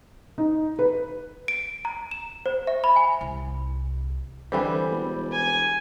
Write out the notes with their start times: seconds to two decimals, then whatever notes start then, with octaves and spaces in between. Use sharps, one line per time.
0.38 D#4
0.79 B4
1.48 D7
1.85 A#5
2.11 E7
2.46 C5
2.67 E5
2.84 B5
2.96 G#5
3.21 C2
4.52 D3 E3 G3 C4
4.90 E1
5.32 G#5